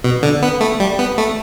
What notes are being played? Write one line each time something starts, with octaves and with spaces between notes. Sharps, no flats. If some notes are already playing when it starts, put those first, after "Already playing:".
B2
D3
B3
A3
G3
B3
A3